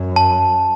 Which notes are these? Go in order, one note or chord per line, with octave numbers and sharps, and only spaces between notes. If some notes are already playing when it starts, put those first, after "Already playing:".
Already playing: F#2
A5